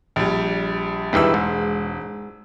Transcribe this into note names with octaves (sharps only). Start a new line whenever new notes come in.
A#1 G3
E1 G2 D#3 E3 B5 E6
G#2